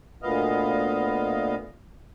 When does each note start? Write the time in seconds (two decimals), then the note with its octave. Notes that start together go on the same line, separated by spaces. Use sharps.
0.22 D2 A#2 B3 D#5 F5